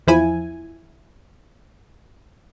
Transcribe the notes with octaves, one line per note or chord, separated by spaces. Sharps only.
E2 F3 E4 G#5